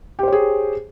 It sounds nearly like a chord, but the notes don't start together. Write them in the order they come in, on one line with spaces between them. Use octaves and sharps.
G4 C5 C#5 G#4